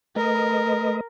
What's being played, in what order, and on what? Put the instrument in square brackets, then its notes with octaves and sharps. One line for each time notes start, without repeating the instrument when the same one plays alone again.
[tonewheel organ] A3 B4 D#5 [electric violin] A#4